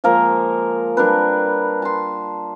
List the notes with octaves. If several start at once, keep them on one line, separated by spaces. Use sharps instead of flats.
F3 G#3 A#3 A#4
G3 D4 A#4 B4
A5 C6